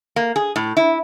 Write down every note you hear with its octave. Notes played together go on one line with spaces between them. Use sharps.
A#3
G#4
A2
E4